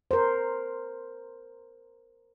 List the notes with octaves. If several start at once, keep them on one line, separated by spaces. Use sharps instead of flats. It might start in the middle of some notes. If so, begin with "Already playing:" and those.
A#4 C5